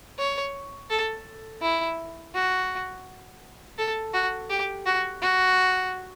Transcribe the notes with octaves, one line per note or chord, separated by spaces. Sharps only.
C#5
A4
E4
F#4
A4
F#4
G4
F#4
F#4